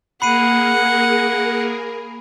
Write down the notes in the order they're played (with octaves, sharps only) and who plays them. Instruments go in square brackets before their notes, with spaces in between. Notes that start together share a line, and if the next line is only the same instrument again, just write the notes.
[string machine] A#3 G#4 A#4 [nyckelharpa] F#5 [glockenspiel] B5 C7 D#7